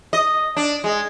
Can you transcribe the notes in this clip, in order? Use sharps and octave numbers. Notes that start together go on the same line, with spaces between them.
D#5
D4
G#3